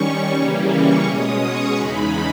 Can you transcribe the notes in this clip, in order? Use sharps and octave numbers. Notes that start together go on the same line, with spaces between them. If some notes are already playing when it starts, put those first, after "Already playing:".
Already playing: D#3 G3 C#4 C#6
C#3 E3 G3 A#3 C#4
C#6
B2 G#3 C#4 D#6
C#6
E2 C#3 G#3 D#4 B5